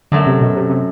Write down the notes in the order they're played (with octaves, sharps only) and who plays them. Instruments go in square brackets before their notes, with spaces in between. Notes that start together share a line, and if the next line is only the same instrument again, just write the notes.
[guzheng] F#2 F#3 A3 [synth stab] D3
[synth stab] C3
B2
C3
C3